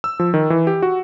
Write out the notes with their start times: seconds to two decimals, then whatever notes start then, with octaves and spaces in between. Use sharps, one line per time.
0.04 E6
0.20 F3
0.34 D#3
0.50 E3
0.67 G4
0.82 F#4